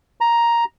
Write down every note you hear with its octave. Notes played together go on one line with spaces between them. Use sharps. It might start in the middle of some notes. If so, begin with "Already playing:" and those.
A#5